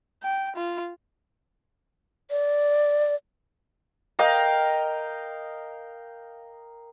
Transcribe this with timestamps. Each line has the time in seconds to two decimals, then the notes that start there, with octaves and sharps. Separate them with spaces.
0.23 G5
0.56 F4
2.30 D5
4.19 A#4 D#5 F5 G5